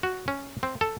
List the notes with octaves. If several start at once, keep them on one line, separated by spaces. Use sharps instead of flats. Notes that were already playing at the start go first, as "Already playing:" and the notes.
F#4
C#4
C4
A4